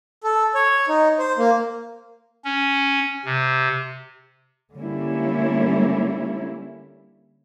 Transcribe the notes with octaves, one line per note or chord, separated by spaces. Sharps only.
A4
C#5
D#4
C5
A#3
C#4
C3
D3 G3 A#3 C#4 E4